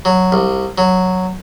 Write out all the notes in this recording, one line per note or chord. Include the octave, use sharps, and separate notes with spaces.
F#3
C2
F#3